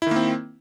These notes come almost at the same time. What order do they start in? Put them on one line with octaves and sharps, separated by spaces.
E4 D#3 A#3 C4